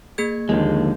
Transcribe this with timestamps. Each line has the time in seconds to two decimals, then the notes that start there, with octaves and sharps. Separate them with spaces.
0.18 A#3 G#4 G#6
0.49 D#2 D3 F3 G#3